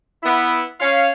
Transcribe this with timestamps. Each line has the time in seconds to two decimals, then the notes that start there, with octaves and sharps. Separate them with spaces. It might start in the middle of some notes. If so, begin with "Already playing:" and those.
0.23 B3 E4
0.81 C#4 F5